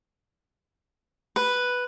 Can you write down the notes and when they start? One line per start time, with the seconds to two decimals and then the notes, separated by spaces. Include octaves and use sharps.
1.36 B4